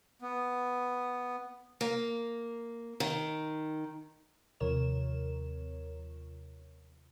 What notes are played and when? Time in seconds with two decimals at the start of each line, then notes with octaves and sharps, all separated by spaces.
0.22 B3
1.81 A#3
3.00 D#3
4.60 D#2 C3 F3 A#4 C#5 E7